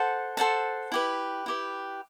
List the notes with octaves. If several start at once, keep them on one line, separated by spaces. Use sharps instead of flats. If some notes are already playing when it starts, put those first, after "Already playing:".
Already playing: A4 C5 F#5 A5
A4 C5 F#5 A5
E4 G4 B4
E4 G4 B4